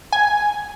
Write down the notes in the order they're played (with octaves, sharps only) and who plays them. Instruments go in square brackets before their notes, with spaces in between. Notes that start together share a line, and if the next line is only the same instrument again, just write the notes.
[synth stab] G#5